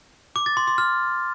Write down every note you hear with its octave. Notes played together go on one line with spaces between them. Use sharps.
D6
A6
C6
C6
F6